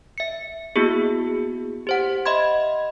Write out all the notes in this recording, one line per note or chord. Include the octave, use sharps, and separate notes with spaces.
E5 C#7
A#3 B3 E4 F#4 G#4
G4 C5 F#5
D#5 E5 B5 C6 G#6